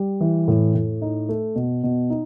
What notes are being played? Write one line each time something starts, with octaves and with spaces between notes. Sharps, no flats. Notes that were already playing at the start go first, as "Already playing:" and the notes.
Already playing: G3
E3
A2
A2
D#4
A3
B2
B2
D#4